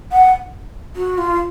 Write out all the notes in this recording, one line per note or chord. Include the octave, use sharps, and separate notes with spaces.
F#5
F#4
F4